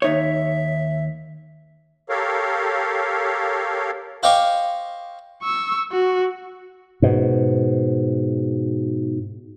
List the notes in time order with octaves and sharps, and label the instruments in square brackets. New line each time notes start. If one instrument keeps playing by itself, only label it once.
[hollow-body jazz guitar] D#2 D#4 C#5 [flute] E5
[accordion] G4 A4 A#4 C#5 F5
[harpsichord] C5 D#5 F5 G5 C#6 D6
[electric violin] C#6 E6
F#4
[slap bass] G#2 B2